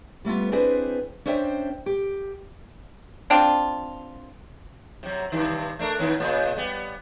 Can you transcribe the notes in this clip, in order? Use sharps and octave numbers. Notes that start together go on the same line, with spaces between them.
G3 A3 B3 F4
C4 D4 E4 G#4 B4 C5
C#4 D4 C5 E5 G5
G4
C4 D4 F4
C3 F#3
G2 C3 D#3
A3 D4 A#4
D#3 B3 C#4
A#2 C#3 B3
G3 B3